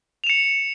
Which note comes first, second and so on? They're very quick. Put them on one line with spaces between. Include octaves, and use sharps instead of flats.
F7 E7 C#7